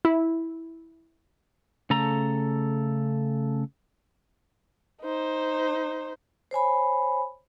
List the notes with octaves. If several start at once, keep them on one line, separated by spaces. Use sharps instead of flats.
E4
C#3 A3 A4 A#5
D#4 C5
C5 C#5 G#5 B5